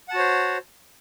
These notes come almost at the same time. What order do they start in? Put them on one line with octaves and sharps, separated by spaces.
F#5 A5 F#4 C#5 C5